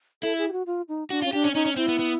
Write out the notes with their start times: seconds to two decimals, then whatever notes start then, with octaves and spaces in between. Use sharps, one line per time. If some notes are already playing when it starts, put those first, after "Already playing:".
0.23 E4 A4
0.38 G#4
0.48 G4
0.52 F#4
0.66 F4
0.88 D#4
1.10 D4 F#4
1.22 C#4 F4
1.33 D4 G4
1.44 C#4
1.54 C#4 D#4
1.66 C#4
1.76 C4 E4
1.88 B3
1.99 B3